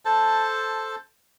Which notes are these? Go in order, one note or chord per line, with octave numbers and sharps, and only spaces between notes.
A4 C5 A5